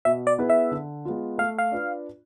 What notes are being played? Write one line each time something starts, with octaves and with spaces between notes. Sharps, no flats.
B2 E5
D5
B3 E4 G#4 B4
E5
D3
G#3 B3 F4
A3 F5
F5
D4 F4 B4